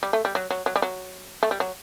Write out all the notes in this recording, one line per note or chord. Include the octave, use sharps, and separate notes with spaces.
G3
A3
G3
F#3
F#3
F#3
G3
F#3
A3
G3
F#3